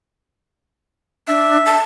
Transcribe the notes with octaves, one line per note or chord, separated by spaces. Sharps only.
D4 E5
A5